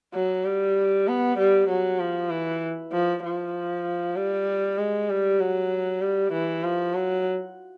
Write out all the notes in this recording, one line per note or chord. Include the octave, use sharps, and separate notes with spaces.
F#3
G3
B3
G3
F#3
F3
E3
F3
F3
G3
G#3
G3
F#3
G3
E3
F3
F#3